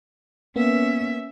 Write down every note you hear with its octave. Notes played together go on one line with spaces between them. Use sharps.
A#3 B3 C#4 E5